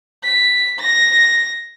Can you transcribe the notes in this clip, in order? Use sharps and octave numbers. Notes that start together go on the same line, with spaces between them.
B6
A#6